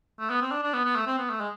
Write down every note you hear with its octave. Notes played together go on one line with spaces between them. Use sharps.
A3
B3
C4
D4
D4
B3
B3
A3
C4
B3
A3
G#3